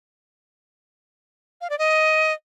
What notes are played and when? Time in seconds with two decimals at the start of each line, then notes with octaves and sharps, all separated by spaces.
1.61 F5
1.70 D5
1.79 D#5